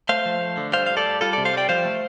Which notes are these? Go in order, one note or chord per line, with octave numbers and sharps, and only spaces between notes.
A3 C5 F5
F3
A3
D3
G3 C5 F5
A2 F5
A4 D5
G3
G3 F4 A4
C3 A4 D5
C5 F5
G3 D5 G5
F3 C5 F5
A3